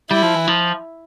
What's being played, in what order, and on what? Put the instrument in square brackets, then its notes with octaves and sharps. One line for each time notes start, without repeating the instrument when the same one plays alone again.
[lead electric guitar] G3 [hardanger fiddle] E4
[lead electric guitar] F3
E3
F3